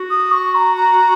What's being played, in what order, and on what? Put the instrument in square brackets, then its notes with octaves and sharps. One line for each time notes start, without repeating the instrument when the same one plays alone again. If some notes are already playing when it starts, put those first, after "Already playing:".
Already playing: [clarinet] F#4
[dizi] D#6
C#6
A#5
A#5